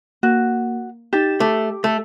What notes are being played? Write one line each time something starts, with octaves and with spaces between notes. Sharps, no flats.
A#3 F#4
D#4 G4 A6 E7
A3 D6
A3